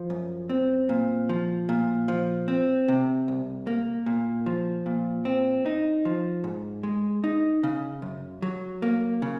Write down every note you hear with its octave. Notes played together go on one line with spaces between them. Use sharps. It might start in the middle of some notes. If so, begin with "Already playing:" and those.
Already playing: F3
F#2
C4
A#2
F3
A#2
F3
C4
C3
C2
A#3
A#2
F3
A#2
C4
D#4
F3
G#2
G#3
D#4
C#3
F#2
F#3
A#3
C#3